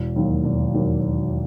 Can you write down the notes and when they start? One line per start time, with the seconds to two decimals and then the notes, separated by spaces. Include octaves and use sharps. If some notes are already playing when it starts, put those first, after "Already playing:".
Already playing: E1
0.16 D#2 D#3 F#3 A#3
0.44 E1
0.74 D#2 D#3 F#3 A#3